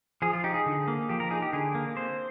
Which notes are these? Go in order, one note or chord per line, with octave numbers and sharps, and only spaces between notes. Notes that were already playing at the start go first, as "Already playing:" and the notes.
F3 G#4
F4
D#4 G4
G#4
D3
A#3
F3 G4
A#4
D#4 G#4
G4
D3 G#4
A#3
C4 C5